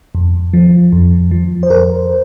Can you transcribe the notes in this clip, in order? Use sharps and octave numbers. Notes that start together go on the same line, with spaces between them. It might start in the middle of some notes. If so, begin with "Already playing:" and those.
F2
F3
F2
F3
C5
F2 A#4